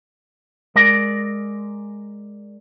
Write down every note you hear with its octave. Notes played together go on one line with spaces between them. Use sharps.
G#3 A#4 D5 A#5